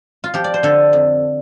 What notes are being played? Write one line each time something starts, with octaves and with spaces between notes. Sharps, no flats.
F4
F3 G4
D5
C5
D3 A4
F2